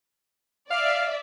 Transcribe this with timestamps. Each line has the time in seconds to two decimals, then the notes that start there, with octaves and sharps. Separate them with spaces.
0.71 D5 E5 F5